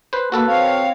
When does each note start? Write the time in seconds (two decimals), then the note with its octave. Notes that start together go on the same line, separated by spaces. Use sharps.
0.13 B4 C5
0.32 A#3 F#4 A4 B4
0.47 C4 C#5 F5